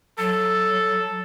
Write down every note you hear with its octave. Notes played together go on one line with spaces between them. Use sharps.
F#3 A4